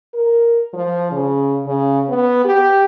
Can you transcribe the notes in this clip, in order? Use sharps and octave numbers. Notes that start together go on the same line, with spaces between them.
A#4
F3
C#3
C#3
B3
G4